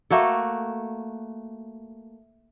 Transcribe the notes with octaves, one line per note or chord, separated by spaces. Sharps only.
A3 A#3 F#4 A4